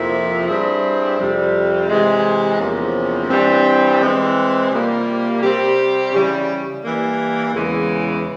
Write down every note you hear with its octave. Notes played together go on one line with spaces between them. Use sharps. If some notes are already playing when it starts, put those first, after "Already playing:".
Already playing: F2 C3 F3 A#3 E4
G2 G3 C4 E4 G#4
F2 C3 G3
C3 E3 G#3
E2 C3 F3 A#3 C#4
G2 E3 G3 C4
E3 G#3 C4
C3 G3 A#3 F4
C3 G3 C4 G4
C#3 E3 G3
E3 G3 A#3
E2 C#3 E3 G#3